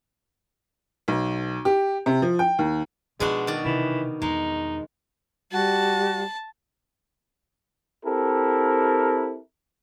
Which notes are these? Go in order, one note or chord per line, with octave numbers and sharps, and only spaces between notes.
B1
G4
C3
F3
G5
D#2
B2 F3 G#3 D4 F4 F#4
D#3 D5
C3 E3
E2 G#3 D#4
G3 F#4 A5
C4 E4 G4 A4 A#4